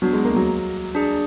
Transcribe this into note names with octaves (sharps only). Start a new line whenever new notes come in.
F#3 B3 D4 F#4
G#3
A#3
F#3
D4 G#4 D5